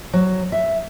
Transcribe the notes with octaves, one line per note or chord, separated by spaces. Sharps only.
F#3
E5